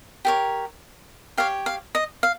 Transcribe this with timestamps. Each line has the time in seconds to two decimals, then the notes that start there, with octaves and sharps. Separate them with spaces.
0.25 G4 A#4 C#5
1.37 G4 C#5 F5
1.66 F5
1.95 D#5
2.23 F5